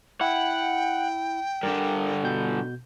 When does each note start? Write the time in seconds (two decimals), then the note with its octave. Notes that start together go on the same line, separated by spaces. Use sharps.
0.21 E4 F#5 G5
1.63 G2 D3 A#4
2.23 B2 G6